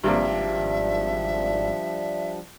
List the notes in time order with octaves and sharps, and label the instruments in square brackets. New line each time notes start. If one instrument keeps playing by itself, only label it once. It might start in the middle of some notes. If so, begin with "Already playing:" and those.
[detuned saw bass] G#1 [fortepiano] G2 C3 A#3 [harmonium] F3 G3 D4 [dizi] E5